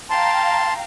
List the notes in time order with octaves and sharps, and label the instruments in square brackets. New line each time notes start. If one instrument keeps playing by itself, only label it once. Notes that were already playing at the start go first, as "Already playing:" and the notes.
[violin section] F5 G5 A#5 [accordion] A5 C6